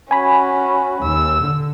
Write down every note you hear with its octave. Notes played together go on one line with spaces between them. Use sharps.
C#4 F#4 G#5 B5
D#2 E6
D3